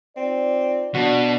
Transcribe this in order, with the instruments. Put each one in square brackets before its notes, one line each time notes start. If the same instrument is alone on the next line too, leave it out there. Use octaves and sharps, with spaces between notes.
[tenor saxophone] C4 [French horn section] D#4 F4 D5
[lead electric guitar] B2 [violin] D4 [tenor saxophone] F#4